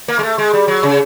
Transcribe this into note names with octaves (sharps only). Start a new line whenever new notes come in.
A#3
G#3
A3
G#3
G3
F#3
C#3